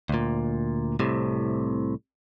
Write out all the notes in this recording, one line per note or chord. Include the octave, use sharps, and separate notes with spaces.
D2 A#2
C2 A2 C3